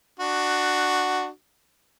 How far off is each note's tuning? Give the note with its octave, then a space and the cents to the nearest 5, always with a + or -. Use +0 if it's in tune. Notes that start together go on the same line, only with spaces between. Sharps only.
D4 +20 F#4 +0